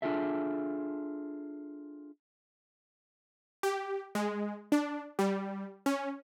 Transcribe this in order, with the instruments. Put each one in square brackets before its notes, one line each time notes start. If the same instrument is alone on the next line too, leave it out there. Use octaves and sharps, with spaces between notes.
[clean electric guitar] D4 F4 G#4 A4 E5
[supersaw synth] G4
G#3
D4
G3
C#4